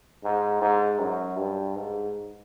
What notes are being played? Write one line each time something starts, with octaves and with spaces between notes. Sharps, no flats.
G#2
G#2
F#2
G2
G#2